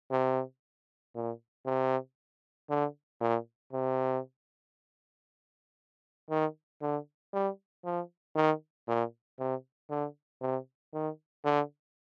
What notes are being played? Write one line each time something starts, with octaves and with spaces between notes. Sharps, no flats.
C3
A#2
C3
D3
A#2
C3
D#3
D3
G3
F3
D#3
A#2
C3
D3
C3
D#3
D3